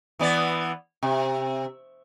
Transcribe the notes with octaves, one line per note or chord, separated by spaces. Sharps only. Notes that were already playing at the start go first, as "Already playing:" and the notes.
E3 B3 D5
C3